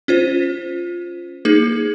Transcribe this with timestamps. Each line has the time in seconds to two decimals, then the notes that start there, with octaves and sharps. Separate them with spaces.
0.08 C#4 F4 C5
1.45 A#3 D#4 G#4